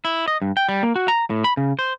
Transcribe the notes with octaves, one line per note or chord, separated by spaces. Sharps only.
E4
D#5
G2
G5
G3
A#3
F#4
A#5
A2
B5
C#3
C5